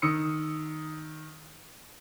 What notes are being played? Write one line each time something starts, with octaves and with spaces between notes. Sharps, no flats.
D#3 D#6 E6 C#7